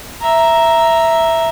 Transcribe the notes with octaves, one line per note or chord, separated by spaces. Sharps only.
E5 A#5